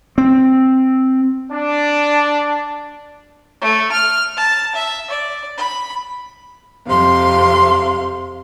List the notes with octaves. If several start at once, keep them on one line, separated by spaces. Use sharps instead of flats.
C4
D4
A3
F6
A5
E5
D5
B5
F2 C3 F5 C6